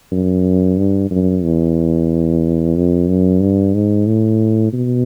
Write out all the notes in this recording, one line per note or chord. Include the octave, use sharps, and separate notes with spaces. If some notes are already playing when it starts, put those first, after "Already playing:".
F#2
G2
F#2
E2
F2
F#2
G2
G#2
A2
B2